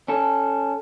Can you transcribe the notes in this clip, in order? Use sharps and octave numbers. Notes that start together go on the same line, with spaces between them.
C#4 A4